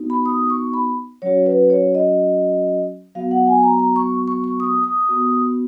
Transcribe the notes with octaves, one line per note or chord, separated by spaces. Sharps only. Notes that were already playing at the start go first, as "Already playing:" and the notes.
Already playing: B3 D#4 F#4
B5
D#6
C#6
B5
F#3 C#4 F#4 C#5
B4
C#5
D#5
F#3 B3 F#4 F5
F#5
G#5
A#5
A#5
C#6
C#6
C#6
D#6
D#6
B3 F#4